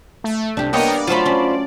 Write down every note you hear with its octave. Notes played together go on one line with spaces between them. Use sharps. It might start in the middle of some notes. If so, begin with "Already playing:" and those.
A3
C2 D4 G4
A#3 B3 A#4 C#5 D#5 G5
D5
F#3 A3 F4 C5 B5
C#4 C6